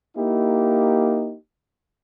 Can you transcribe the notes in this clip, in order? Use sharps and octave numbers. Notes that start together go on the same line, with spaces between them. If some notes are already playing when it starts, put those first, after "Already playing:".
A#3 D#4 E4 G4